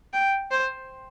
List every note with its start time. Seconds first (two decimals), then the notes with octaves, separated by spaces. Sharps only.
0.14 G5
0.51 C5